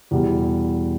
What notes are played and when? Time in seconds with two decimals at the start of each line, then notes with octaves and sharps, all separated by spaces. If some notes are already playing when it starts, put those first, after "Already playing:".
0.11 E2 B2 G3